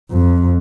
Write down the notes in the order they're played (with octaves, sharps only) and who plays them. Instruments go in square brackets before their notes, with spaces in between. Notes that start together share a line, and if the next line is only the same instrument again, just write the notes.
[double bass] F2